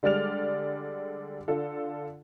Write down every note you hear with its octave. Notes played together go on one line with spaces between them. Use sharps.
D3 G3 G#3 D5 F6 F7
D3 F4 A4